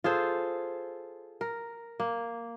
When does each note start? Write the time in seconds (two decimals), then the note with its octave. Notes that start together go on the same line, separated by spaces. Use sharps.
0.04 F4 G#4 A4 C5
1.41 A#4
2.00 A#3